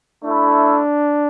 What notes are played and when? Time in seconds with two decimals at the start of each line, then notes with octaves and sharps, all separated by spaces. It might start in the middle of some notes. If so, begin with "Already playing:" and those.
0.24 A3 D4 E4 A4